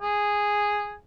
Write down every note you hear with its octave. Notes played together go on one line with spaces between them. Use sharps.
G#4